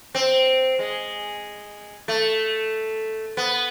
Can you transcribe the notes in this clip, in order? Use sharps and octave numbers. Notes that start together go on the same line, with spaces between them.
C4
G#3
A3
B3